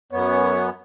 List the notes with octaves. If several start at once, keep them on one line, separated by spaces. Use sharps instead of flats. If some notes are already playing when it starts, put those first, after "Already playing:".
F#2 B3 C#5